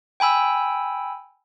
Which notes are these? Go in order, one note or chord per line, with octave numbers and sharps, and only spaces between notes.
G5 G#5 B5 E6